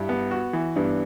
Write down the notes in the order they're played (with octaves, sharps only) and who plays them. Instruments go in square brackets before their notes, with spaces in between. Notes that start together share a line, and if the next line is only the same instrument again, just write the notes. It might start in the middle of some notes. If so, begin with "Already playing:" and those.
Already playing: [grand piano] G2 [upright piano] E4 G4
[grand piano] B3
F#4
E3
[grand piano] G2 [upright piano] B3 D4